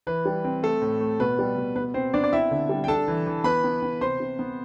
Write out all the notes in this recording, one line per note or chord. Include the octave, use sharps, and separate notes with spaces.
E3 B4
G3
C4
A3 A4
A2
A3
B2 B4
G3
B2
B3 B4
B2 C4 C5
B3 D4 D5
D5
C4 E4 E5
D3
G3
G5
D4 A4 A5
E3
E3
B3 B4 B5
B3
B3
C3 C5 C6
C3
B3